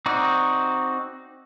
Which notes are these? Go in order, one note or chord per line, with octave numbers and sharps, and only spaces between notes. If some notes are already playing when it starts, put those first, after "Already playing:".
C4 D#4 F#4 D5